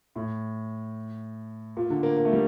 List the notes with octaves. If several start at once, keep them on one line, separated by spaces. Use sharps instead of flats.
A2
A#2
D3
A#3
A#3
A3
G3